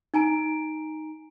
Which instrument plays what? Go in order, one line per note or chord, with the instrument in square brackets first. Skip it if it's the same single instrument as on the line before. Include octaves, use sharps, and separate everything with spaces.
[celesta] D#4 G#5 A#5 D7